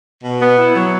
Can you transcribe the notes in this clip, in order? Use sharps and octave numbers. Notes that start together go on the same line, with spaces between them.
B2
B3
E4
F#3